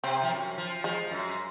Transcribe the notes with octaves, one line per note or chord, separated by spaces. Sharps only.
C3 C4
F3
F#2
F3
F3 G#3
F#2